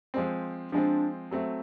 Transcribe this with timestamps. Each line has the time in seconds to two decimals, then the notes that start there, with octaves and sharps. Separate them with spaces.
0.14 F3 G#3 C4
0.72 F3 G#3 C4 D4
1.31 F#3 A3 C4